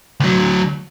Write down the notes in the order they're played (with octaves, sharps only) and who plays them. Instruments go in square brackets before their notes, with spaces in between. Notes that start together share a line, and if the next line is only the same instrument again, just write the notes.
[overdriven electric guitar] D2 F#3